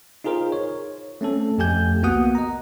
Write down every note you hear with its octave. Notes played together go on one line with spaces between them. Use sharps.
D#4 F4 G#4 A#4 C5
C#5
A3 C4 C#4 A4
F2 A3 G4 G#5 G6
C2 A#3 B3 F#4 F#5 D#6
D#5 A#5